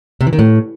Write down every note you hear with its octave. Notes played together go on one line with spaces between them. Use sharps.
C3
E3
D#3
A2